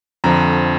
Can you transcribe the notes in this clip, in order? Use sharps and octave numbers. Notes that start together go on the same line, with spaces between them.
F2 D3 F3 A#5